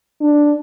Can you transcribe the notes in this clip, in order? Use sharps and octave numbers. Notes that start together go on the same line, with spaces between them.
D4